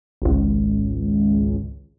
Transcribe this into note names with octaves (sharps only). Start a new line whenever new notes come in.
G#1 C#2